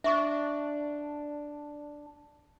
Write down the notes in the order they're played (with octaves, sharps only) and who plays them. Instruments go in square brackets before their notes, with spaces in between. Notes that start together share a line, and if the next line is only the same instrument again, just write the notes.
[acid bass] D4 [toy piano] E5 C#6 D6